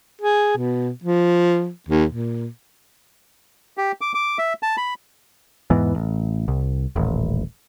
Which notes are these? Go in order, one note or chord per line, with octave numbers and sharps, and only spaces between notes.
G#4
B2
F3
D#2
A#2
G4
D6
D6
E5
A5
B5
E2 G#2 E3 B3
A1
C2
D#1 A1